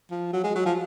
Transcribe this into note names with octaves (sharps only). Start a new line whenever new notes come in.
F3
F#3
G#3
F#3
F3